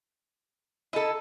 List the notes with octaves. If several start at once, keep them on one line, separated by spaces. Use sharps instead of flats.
E4 A4 D#5 A5 B5